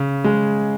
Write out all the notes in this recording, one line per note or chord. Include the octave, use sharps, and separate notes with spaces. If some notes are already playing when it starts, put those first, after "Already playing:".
Already playing: C#3
G#3